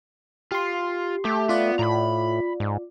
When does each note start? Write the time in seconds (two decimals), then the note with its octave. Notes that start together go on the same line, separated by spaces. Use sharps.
0.52 F4 G4 C6
1.25 A3 G4
1.49 B3 F4 D5
1.79 A2 A#5 B5
2.60 G#2